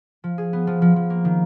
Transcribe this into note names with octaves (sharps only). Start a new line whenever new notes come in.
F3
G#4
B3
F3
F3
F3
A#3
D#3